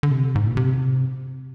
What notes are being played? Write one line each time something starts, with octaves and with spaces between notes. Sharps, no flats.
D3
C3
G#2
A#2
C3